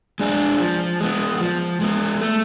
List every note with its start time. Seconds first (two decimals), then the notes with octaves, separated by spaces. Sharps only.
0.20 G#3 D4 G#4
0.60 F3
1.00 G#3 B3
1.41 F3
1.81 G#3 B3
2.21 A3